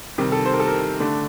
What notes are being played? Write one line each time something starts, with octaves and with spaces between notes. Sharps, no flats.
C3 D#3 G3
A4
C5
A#4
A4
A#4
D3 A3 D4